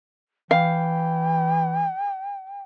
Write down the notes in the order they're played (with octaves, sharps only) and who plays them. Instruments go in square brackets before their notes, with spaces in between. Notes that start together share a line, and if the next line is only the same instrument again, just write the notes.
[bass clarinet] E3 [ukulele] F5 [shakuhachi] G5